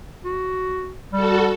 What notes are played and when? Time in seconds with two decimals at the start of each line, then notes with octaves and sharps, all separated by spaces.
0.25 F#4
1.13 G3 F#4 A4